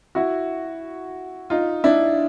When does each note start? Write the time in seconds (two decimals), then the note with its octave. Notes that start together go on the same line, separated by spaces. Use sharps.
0.15 E4 F#4
1.50 D#4 F4
1.84 D4 E4